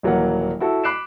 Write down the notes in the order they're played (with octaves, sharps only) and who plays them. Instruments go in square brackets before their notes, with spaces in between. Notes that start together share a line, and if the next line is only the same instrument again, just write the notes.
[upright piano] D#1 E3 F#3 A#3 A#4 F#5
E4 F#4 A4
B5 D6 F#6 C7 D7 E7